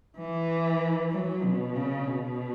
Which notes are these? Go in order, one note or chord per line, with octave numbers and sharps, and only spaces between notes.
E3
F#3
B2
C#3
B2